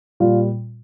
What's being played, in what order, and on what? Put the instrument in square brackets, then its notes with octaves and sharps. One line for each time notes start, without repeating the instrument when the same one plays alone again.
[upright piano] A#2 G3 F4